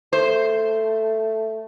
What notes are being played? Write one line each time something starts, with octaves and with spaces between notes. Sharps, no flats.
A3 C5